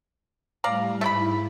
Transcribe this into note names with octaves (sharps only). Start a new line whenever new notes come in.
A2 G3 D5 F5 A#5
G#2 A3 E4 B5